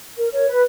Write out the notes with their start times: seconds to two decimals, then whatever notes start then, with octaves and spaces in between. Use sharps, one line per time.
0.17 A#4
0.32 A#4 C#5
0.47 B4